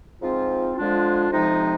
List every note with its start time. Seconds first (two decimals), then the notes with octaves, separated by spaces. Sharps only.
0.21 G#2 F3 C4 F4
0.76 D3 F3 G#3 D4 F4
1.31 F2 C3 F3 G#3 D#4